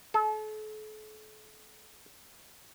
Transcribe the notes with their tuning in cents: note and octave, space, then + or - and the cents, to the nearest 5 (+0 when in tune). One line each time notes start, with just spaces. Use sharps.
A4 -40